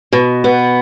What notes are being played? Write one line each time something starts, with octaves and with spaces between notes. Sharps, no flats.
B2
B3